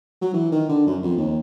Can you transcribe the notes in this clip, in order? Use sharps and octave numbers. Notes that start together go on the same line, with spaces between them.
F#3
E3
D#3
D3
F#2
F2
D#2